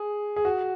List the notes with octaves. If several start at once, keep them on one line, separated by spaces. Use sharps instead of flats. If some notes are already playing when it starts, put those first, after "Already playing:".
Already playing: G#4
G#4
F#4